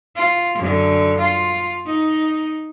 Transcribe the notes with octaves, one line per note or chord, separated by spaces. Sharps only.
F4
F#2 D3
F4
D#4